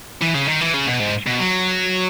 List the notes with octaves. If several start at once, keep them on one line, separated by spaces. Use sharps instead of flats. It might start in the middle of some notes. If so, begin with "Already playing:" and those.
E3
C#3
D#3
E3
C#3
B2
G#2
B2
F#3